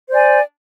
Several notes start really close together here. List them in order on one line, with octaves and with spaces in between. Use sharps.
C5 D5 G#5